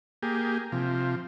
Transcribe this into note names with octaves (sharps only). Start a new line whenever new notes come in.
A#3 G4 G#4
C3 F3